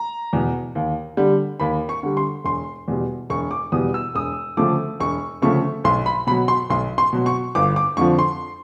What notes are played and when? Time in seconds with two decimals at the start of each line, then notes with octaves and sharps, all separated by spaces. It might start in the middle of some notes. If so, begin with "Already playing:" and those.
Already playing: A#5
0.33 E2 B2
0.75 D#2
1.17 D3 G3
1.60 D#2 B5
1.89 C#6
2.03 D3 G3
2.17 C6
2.44 E1 C6
2.88 E2 B2 G3
3.30 E1 C#6
3.51 D6
3.72 E2 B2 G3 D#6
3.94 E6
4.15 E1 D#6
4.57 D2 C#3 F3 A3 D6
5.00 E1 C#6
5.42 D2 C#3 F3 A3 C#6
5.84 B1 C6
6.06 B5
6.27 B2 B5
6.31 F#3
6.48 C6
6.70 B1 C6
6.98 C6
7.13 B2 F#3
7.26 C#6
7.55 G1 D6
7.76 D6
7.97 F2 D3 F3 C#6
8.19 C6